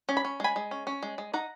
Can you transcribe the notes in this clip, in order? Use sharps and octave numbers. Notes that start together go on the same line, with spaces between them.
C#4
B5
C#4
G#3 G#5 B5
G#3
C#4
C#4
G#3
G#3
D#4 F#5 A#5